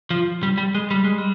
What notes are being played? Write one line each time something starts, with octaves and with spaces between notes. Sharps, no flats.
F3
G3
G3
G#3
G3
G#3
G3